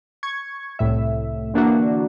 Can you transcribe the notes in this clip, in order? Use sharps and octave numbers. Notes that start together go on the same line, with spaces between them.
C#6 G#6
C2 A2 E5
D3 E3 A#3 D4 E4 F#4